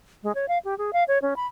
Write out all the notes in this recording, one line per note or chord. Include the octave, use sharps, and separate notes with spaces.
G#3
C#5
F5
G4
G#4
F5
C#5
C#4
B5